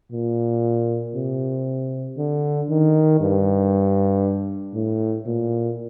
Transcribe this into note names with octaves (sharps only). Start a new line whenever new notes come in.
A#2
C3
D3
D#3
G2
A2
A#2